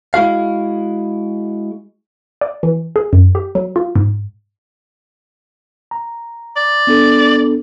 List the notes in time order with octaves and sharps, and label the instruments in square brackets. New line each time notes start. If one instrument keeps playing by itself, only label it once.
[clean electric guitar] G#3 E4 F#4 F5
[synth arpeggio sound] D5
E3
G#4
F#2
G4
F#3
F4
G#2
[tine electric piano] A#5
[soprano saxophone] D5
[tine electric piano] B3 D4 A4